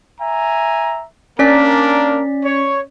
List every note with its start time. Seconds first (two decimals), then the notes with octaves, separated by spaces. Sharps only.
0.21 E5 G#5 A#5
1.39 A#3 C#4 D4 A#4 D5 B6
2.45 C#5